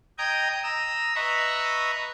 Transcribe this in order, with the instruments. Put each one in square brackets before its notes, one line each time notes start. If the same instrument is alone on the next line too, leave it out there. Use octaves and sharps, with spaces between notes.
[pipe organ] D#5 G5 A#5 D#6 G6 G#6
A#5 D#6 E6
B4 D#5 E5 A#5 B5 C#6